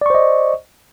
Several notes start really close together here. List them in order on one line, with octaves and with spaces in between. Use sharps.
D5 C#6 C5 D#5